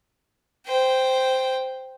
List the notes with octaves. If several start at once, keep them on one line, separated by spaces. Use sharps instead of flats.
C5 G5